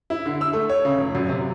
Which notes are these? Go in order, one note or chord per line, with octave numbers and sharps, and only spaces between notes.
E4
D3
E6
A3
C#5
C#3
F1
F#2
C3